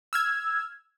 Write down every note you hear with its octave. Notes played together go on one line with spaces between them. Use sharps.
E6 F6 G#6